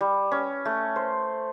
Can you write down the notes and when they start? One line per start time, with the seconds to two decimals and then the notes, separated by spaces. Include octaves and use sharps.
0.01 G3
0.31 C#4
0.65 A3
0.96 C5